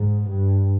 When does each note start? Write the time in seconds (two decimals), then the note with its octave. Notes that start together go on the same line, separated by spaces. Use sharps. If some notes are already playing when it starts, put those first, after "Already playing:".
Already playing: G#2
0.29 G2